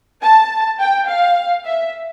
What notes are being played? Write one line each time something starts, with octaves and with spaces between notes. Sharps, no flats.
A5
G5
F5
E5